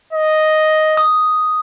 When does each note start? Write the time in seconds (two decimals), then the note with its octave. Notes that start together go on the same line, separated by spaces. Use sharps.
0.13 D#5
0.97 D#6